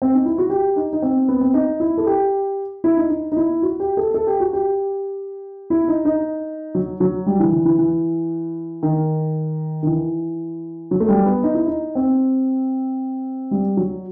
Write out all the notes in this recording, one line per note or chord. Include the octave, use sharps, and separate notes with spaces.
C4
D#4
E4
F#4
G4
D#4
D#4
C4
B3
C4
D#4
E4
A4
G4
E4
D#4
D#4
D#4
E4
F#4
G4
A4
A4
G4
F#4
G4
E4
D#4
D#4
F#3
F#3
G3
E3
E3
E3
E3
D#3
D#3
E3
F#3
A3
G3
B3
D#4
E4
D#4
C4
G3
F#3